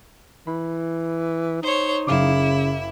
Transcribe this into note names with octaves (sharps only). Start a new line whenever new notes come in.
E3 B5
D#4 C5 C#5
F#1 C#3 E4 F5 D6